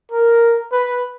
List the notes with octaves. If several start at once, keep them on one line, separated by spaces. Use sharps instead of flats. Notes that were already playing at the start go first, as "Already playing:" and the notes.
A#4
B4